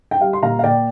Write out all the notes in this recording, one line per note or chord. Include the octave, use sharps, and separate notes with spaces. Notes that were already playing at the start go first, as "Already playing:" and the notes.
G5
G3 F5
C6
A#2 F5 A#5
F5
A#2 D5 G5